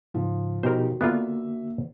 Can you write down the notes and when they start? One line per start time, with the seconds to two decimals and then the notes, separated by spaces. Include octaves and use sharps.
0.14 G#2 C#3 F3
0.63 B2 D#4 F#4 G4 A#4 C5
1.01 D3 A#3 B3 D4 F4 E5